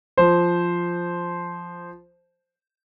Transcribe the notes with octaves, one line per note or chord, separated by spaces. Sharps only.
F3 C5